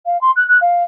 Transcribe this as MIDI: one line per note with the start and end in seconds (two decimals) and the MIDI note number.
0.06 0.20 77
0.21 0.31 84
0.36 0.44 90
0.48 0.58 90
0.61 0.84 77